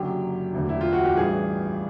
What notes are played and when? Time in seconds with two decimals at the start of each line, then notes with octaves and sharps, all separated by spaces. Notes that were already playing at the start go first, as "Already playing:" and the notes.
Already playing: F#1 F#2 D3 F#3 G4
0.53 E1 D2 D3
0.69 E4
0.81 F4
0.93 F#4
1.05 G4
1.17 A1 G2 E3 G3 G#4